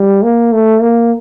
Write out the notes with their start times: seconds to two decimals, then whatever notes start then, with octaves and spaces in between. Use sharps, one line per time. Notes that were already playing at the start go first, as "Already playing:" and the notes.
Already playing: G3
0.23 A#3
0.52 A3
0.82 A#3